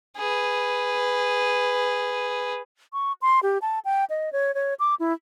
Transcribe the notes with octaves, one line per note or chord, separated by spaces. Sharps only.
G#4 B4
C#6
C6
G4
A5
G5
D#5
C#5
C#5
D6
E4